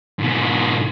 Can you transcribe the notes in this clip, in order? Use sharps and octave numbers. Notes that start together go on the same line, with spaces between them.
G#2 B2